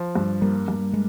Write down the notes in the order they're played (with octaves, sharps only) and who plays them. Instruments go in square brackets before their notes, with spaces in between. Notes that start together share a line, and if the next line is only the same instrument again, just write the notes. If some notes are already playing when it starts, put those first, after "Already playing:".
Already playing: [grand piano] F3
G2
[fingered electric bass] G3 [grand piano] A#3
[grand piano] G2
[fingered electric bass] G#3